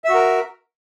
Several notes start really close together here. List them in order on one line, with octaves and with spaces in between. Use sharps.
E5 F#4 A#4